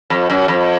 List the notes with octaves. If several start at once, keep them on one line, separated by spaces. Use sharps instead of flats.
F2
F#2
F2